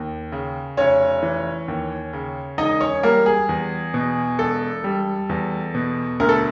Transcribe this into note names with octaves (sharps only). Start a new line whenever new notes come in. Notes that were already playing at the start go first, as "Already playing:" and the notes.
Already playing: D#2
C#3
F1 C#4 C#5
E3
D#2
C#3
E1 D#4 D#5
C#4 C#5
G3 A#3 A#4
G#4
E2
B2
E1 A4
G3
E2
B2
D2 A#4
A4